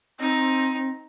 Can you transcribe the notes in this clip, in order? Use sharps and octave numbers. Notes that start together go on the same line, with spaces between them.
C4 D#4